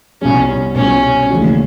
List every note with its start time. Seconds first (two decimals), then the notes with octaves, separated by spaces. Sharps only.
0.22 C2 B2 G3 C#4
0.75 C2 B2 G3 C#4
1.30 D#2 C#3 E3 A3 D4